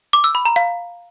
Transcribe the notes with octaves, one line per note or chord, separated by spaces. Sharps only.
D6
E6
B5
A#5
F5